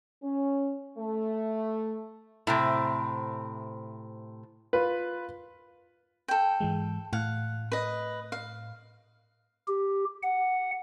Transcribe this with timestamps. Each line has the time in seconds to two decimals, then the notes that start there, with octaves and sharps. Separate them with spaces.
0.23 C#4
0.98 A3
2.47 A2 C3 C4
4.73 F4 B4
6.28 A4 G5
6.61 G#2 E3 G#3
7.13 A2 F5 F#5
7.72 B4 D#5
8.32 F5
9.68 G4
10.23 F#5